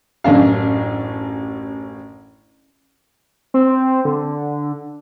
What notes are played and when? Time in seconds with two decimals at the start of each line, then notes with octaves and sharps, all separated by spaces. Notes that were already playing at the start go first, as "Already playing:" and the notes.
0.24 A1 F#2 D4 F5
3.54 C4
4.05 D3